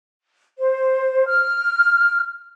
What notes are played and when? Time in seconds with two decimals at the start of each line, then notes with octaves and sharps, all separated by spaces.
0.58 C5
1.27 F6